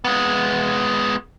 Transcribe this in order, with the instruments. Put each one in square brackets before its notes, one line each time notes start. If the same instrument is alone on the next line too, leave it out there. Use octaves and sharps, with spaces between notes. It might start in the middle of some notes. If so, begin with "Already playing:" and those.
[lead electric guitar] G#3 B3